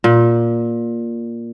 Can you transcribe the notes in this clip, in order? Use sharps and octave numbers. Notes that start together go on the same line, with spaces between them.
A#2